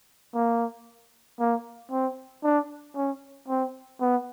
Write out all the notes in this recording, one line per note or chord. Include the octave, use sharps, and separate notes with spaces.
A#3
A#3
C4
D4
C#4
C4
B3